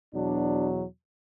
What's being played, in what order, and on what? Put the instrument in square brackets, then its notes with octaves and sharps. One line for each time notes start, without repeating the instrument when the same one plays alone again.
[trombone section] E2 B2 F#3 D4